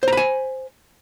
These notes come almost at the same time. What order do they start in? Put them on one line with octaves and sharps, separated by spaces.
C5 A#5 B5 G#5